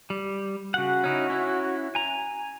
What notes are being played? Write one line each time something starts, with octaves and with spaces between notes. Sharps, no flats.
G3
C#3 F#4 F#5
C#4 D#4 E4
C#4 E4
G#5 A#5